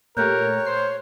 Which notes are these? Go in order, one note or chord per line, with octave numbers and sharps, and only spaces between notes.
A#2 A3 G4 A#4 C#5 F#6 G6
C5 C7